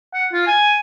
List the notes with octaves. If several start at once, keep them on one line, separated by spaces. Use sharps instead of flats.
F#5
F4
G#5